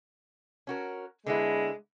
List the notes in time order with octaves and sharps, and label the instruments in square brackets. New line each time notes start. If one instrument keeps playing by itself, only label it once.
[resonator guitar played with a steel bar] C#4 F#4 A#4
[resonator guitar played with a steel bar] D3 B3 E4 [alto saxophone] G#3